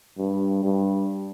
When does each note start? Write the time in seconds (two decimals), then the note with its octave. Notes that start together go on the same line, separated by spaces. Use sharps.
0.18 G2
0.64 G2